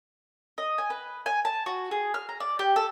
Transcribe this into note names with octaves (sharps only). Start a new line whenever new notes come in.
D#5
G#5
B4
G#5
A5
F#4
G#4
F6
A#5
D5
G4
A4